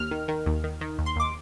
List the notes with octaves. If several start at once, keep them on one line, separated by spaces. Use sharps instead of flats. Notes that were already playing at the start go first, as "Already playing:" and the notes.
Already playing: D#2 F6
D#3
D#3
D#2
D#3
D#3
D#2
C6
D#2 D6